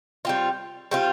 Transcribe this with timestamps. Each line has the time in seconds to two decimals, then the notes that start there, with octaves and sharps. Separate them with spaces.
0.25 G3 C4 F4
0.91 G3 C4 F4